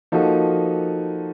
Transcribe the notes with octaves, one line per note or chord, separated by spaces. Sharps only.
F3 A#3 D#4 F#4 A4